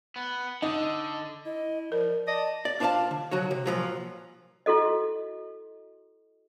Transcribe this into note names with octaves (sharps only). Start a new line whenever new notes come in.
B3
D3 D#4
E4 D#5
F3 A#4 D5
D5 D#5 A5
D5
D4 F4 C5 C#5 F5 A5
D3
C2 F#3 F#4 C#5
C3
A#2 C#3 F3 F#3
E4 F#4 A4 D#5